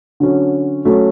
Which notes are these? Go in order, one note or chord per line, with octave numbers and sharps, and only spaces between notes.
D3 F#3 C#4
F#3 A3 C#4